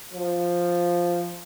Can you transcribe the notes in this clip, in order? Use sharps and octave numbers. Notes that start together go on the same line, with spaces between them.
F3